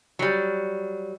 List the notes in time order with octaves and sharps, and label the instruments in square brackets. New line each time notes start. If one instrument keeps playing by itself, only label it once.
[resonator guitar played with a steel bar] F#3 G3